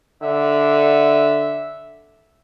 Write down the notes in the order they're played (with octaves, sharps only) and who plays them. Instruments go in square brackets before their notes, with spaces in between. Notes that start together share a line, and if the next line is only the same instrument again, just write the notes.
[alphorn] D3 [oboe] E5